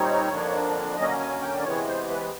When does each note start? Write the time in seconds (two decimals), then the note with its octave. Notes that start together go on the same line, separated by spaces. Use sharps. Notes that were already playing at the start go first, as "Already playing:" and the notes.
Already playing: A#2 G3 C4 D#4 C#5
0.29 F2 D3 F3 A#3 D4
0.97 D3 F#3 A#3 C#4 D#5
1.19 G#5
1.42 G5
1.54 D5
1.64 C3 E3 G#3 B3 C#5
1.87 C5
2.10 B4